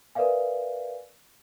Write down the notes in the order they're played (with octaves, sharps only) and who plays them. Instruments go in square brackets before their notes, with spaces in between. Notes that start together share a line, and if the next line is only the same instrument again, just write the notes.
[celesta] A#4 B4 D5 E5 F5 G#5